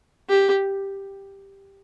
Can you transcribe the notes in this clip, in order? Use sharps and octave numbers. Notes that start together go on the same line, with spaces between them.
G4